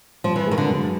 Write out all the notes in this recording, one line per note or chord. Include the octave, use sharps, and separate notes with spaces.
G2 F3
E3
D#3 G#3
D3
F#2